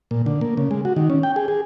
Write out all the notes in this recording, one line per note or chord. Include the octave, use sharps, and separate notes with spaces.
A#2
D3
A#3
C#3
G#3
F#4
D#3
C#4
G5
G#4
G#4